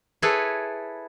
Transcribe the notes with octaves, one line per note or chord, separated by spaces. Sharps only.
E4 G#4 A4 B4 C#5